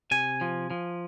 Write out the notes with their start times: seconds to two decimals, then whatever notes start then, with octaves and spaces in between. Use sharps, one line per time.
0.11 C3 G#5
0.41 F3
0.71 F3